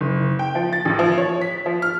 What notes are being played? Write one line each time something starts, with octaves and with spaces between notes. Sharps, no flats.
F#1
G5
F3
A6
A1
F3
C#5
B6
F3
F6